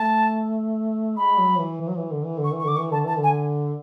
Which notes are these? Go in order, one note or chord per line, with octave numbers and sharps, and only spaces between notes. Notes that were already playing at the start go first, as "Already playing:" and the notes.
Already playing: A3 A5
G#3 B5
F#3
E3
E3
F#3
E3
D3
E3
D3
C#6
E3
C#6
D3 D6
C#6
E3
D3 A5
E3 A5
D3
G#5